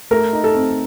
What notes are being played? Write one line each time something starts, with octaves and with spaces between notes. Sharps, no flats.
A3 A#4
D#4
A4
C4